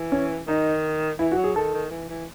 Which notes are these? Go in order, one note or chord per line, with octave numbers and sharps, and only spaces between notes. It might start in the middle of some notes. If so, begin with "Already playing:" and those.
Already playing: E3
C#4
D#3 D#4
E3 E4
F#4
F#3
G#4
D#3 A4
D#3
E3
E3